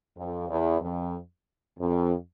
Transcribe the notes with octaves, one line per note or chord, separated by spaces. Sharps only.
F2
E2
F2
F2